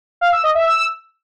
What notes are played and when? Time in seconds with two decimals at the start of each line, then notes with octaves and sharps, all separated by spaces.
0.21 F5
0.32 E6
0.44 D#5
0.55 E5
0.66 E6